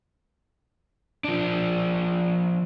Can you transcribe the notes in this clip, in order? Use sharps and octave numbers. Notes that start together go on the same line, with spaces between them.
F3 D4